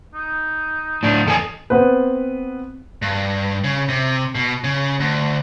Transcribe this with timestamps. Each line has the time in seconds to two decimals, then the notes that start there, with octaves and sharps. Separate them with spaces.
0.14 D#4
1.03 A2 D4
1.25 E2 A4 D#5 G#5
1.70 B3 C4 B4
3.02 G2
3.64 C#3
3.89 C3
4.35 B2
4.64 C#3
5.00 D2